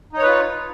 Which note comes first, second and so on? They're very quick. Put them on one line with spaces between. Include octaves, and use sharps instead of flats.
D#4 C#5 B4 F4